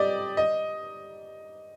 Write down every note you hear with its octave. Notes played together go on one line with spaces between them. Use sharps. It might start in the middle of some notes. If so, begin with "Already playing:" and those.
Already playing: G4 D5 D#5
D#5